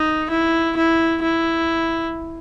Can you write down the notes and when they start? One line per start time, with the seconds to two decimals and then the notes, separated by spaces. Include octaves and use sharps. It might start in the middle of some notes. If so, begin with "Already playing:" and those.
Already playing: D#4
0.30 E4
0.76 E4
1.22 E4